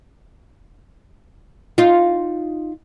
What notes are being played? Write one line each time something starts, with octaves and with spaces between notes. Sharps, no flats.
D#4 F4